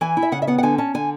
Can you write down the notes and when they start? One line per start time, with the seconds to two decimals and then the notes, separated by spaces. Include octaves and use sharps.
0.01 E3 G#5
0.17 E4
0.22 E5
0.32 C#3 F#5
0.42 E5
0.47 B3 F#5
0.58 F#5
0.63 D3 G#5
0.78 C#4 A5
0.94 D3 G#5